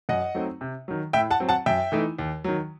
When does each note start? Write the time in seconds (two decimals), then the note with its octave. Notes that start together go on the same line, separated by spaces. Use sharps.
0.09 F#2 D#5 F#5
0.35 F#3 A3 C4 D#4
0.61 C3
0.88 D#3 F#3
1.13 A2 E5 G5
1.31 F#5 A5
1.40 F#3 C4
1.49 F#5 A5
1.66 F#2 E5 G5
1.92 E3 A3 D#4
2.19 D#2
2.44 D#3 F#3